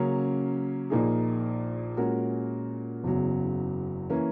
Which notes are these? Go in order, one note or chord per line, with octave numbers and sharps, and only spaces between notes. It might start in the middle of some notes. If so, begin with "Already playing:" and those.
Already playing: C#3 F#3 A#3 C#4
A#1 A#2 A#3 D#4 G#4
A#2 G#3 C#4 F#4 A#4
F#1 E2 C#3 F#3
E3 A#3 C#4